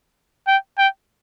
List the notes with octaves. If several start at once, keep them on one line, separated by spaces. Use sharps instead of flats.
G5
G5